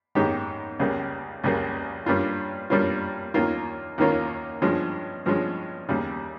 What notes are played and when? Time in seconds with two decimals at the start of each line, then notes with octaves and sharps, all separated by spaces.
0.15 G#2 D#3 G#3 C#4 G4
0.79 C#2 C#3 G3 A#3
1.44 C#2 C#3 G3 A#3
2.06 G2 G3 A#3 C#4 F4
2.70 G2 G3 A#3 C#4 F4
3.34 D#2 D#3 A#3 C#4 F4
3.98 D#2 D#3 A#3 C#4 F4
4.62 G2 F3 G#3 C#4
5.26 G2 F3 G#3 C#4
5.89 D#2 C#3 G3